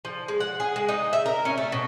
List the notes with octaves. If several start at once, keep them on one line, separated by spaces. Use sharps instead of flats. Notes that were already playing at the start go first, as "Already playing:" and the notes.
F3
G#3
F#5
G#4
G#3
D#4
E5
A#4
C#4
A3
B2